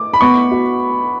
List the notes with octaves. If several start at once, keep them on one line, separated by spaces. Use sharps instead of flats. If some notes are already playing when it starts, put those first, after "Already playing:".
Already playing: D6
B5
B3 C#6
F#4